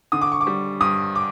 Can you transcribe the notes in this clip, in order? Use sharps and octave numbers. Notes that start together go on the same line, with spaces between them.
D3 D#6
D6
C#6
D6
G3
G2 D#6
D6